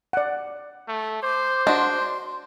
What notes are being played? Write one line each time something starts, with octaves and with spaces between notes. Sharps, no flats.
D5 F#5
A3
C5 D6
D4 F#4 D#5 C6